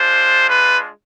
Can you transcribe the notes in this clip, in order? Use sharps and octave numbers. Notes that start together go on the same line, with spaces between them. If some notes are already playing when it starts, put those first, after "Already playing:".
Already playing: G#3 D4 F4 C5
B4